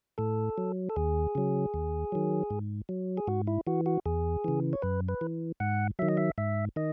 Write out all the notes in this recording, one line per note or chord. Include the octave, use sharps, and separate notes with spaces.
A2 A4
F#3
A4
D#2 G#4
C#3 F#3
D#2
D#3 F#3
G#2
F#3
G#4
G#2 F#4
E4
E3 F#4
F#4
E2 G#4
C#3 E3
C#5
F#2 B4
B4
E3
G#2 F#5
D#3 F#3 E5
D#5
E5
G#2 E5
D#3 D#5